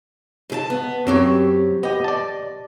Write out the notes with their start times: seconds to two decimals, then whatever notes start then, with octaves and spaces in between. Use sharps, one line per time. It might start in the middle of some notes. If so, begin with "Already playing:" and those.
0.50 G#2 G#4 A5
0.70 B3
1.07 F#2 F#3 C4 G4 C#5
1.83 B3 G4 D#5
2.04 D5 A5